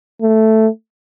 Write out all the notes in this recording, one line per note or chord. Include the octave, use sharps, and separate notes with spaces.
A3